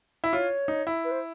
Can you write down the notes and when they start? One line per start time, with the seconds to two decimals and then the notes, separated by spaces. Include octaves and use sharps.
0.24 E4
0.33 F4 C#5
0.68 D#4
0.87 E4
1.04 B4
1.11 C5